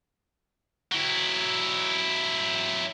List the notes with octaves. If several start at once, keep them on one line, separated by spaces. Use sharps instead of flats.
F#3 E4